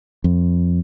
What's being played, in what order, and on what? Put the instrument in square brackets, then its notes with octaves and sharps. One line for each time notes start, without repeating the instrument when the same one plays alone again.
[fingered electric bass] F2